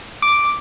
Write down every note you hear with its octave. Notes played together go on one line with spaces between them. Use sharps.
D6